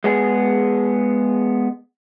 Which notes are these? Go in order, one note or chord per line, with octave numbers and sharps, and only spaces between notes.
G#3 B3 G#4